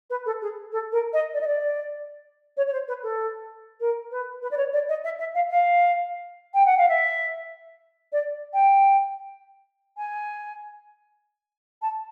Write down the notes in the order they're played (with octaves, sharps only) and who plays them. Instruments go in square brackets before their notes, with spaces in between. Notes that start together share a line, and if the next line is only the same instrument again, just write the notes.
[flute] B4
A4
G#4
A4
A#4
D#5
D5
D#5
D5
C#5
C#5
C5
B4
A4
A#4
B4
B4
D5
C#5
D5
D#5
E5
E5
F5
F5
G5
F#5
F5
E5
D5
G5
G#5
A5